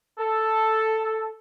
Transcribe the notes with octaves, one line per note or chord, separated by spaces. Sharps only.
A4